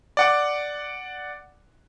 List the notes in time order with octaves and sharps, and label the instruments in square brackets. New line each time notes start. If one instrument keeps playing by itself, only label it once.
[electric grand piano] D5 F#5 D6